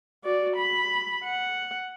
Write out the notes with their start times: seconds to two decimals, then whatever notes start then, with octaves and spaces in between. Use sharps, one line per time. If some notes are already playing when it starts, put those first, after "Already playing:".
0.24 F#4 D5
0.57 B5
1.24 F#5